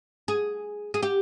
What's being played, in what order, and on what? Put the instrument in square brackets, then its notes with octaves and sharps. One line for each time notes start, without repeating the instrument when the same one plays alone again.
[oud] G#4
G#4
G4